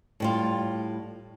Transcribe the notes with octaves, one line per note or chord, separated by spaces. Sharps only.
A2 G3 F4